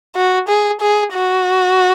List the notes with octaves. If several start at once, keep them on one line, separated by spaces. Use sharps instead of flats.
F#4
G#4
G#4
F#4